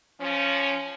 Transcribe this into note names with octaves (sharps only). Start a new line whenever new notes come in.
F3 C#4